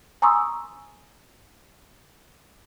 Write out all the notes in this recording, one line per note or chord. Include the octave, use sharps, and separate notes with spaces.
G#5 A#5 C6 C#6 D#6 E6